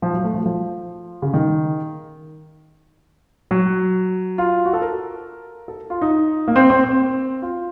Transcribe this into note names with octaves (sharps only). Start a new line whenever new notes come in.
F3
F#3
A3
F3
F3
C#3
D#3
F#3
F4
F#4
A4
A#4
A4
F4
D#4
A#3
C4
C4
C4
F4